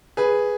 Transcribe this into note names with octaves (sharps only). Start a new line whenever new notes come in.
G#4 B4